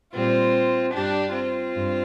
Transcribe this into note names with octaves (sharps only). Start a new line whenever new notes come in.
A#2 G3 C4 F4
G2 G3 D4 G4
C4 F4
G2